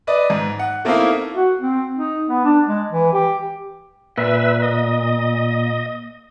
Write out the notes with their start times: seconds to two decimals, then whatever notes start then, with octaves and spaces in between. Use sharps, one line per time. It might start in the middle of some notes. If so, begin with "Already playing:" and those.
0.07 B4 D5 D#5
0.30 G#2
0.59 F#5
0.85 A3 A#3 C4 D#4 E4 F5
1.35 F#4
1.61 C4
1.95 D#4
2.29 B3
2.44 D4
2.67 G#3
2.92 E3
3.13 G4
4.18 A#2 B4 E5
4.62 D#5